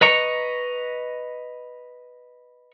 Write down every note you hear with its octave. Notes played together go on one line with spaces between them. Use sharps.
B4 D#5 A#5 C#6